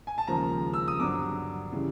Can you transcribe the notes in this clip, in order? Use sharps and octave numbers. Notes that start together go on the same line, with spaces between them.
G#5
A5
D#2 C#3 F3 G#3 A#5
E6
D#6
G2 D3 F#3 D6
C#3 E3 G3